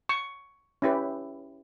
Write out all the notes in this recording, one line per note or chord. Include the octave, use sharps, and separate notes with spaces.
C#6
C#4 E4 G4 B4